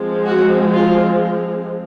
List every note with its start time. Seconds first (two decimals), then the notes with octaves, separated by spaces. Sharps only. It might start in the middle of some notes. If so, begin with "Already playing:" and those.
Already playing: F3 G#3 C4
0.25 F#4
0.73 F4